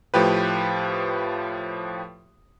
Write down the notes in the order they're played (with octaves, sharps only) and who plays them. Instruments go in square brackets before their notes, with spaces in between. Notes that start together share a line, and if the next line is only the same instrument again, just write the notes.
[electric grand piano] A2 F3 G4 B4